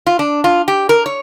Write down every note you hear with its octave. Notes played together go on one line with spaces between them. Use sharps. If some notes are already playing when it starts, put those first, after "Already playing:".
F4
D4
F4
G4
A#4
C#5